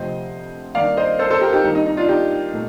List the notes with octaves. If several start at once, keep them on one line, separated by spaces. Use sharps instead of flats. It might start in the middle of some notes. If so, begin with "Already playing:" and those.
Already playing: D2 C3 F3 C4 C5 D#5
G2 D#3 A#3 D5 F5
C5 D#5
A4 C5
A4 C5
G4 A#4
D#4 G4
G2 D#3 G3 A#3 D#4
D#4
D#4
D4 F4
D#4 G4
A#2 A3